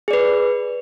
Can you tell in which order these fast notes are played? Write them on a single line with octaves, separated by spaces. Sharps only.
G#4 D5 B4